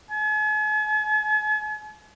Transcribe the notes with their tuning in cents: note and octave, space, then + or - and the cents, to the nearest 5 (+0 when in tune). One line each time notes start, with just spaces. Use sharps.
G#5 +45